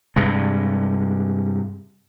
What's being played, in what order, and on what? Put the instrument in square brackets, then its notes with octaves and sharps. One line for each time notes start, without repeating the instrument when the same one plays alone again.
[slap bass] G2 C3 G#3